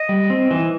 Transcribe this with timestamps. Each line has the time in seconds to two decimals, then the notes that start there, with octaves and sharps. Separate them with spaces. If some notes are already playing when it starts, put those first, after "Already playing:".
Already playing: D#5
0.09 G3
0.30 C4
0.51 E3